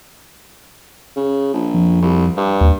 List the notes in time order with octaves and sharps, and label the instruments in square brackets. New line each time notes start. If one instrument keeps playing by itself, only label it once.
[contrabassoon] C#3
A#1
[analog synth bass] F2
[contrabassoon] C2
G2
[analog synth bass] D#2